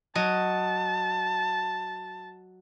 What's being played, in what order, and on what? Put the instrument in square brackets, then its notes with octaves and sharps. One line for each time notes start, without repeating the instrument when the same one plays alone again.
[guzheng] F#3 D#5 [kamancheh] A5